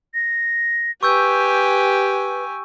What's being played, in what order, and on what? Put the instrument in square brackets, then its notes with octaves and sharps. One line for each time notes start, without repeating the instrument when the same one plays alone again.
[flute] A#6
[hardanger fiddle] G4 G#5 [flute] B4 [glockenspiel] C#6 E6 G6